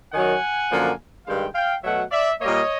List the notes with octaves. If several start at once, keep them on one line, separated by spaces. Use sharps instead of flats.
F#2 D#3 F#3 F#5 G#5
F#2 D3 F3 A#3
G2 D#3 G#3 F5 G5
F5 G5
B2 F#3 A3 E5 F#5
D5 E5
A#2 G3 A#3 C#5 D#5